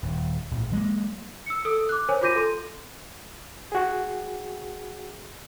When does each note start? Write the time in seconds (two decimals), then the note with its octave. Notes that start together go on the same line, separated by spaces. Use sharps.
0.03 D#1
0.51 A#1 A2
0.72 F#3 G#3 A#3
1.46 E6 C#7
1.65 A4 D#6 E6
1.89 D6 F#6
2.09 A#4 C5 C#5 G#5
2.21 F4 F#4 D6 G6 A#6 D#7
2.35 A4 C6
3.72 F#4 G#4